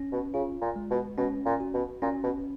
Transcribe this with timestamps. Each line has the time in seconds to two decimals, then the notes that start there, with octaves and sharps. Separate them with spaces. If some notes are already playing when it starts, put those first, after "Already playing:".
Already playing: C#4
0.12 B2
0.34 C#3 F4
0.61 A#2
0.76 G#3
0.90 B2
1.17 B2 C#4
1.46 A#2
1.60 F#4
1.74 B2
2.02 A#2 C#4
2.23 B2